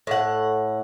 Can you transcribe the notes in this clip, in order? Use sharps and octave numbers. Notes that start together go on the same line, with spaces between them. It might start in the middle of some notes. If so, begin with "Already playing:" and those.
A2 F#5